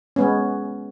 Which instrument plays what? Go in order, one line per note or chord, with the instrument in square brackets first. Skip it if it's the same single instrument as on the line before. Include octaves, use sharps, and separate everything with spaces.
[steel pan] G#3 B3 C#4